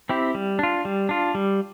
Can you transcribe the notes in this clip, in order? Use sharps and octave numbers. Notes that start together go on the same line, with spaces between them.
C4 E4 G4
G3
D4 F4
G3
D4 F4
G3